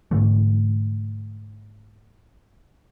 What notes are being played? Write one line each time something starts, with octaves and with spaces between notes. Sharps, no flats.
G#2 D3 E3 A3